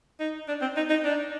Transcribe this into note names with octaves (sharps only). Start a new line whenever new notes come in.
D#4
D4
C4
D#4
D#4
D4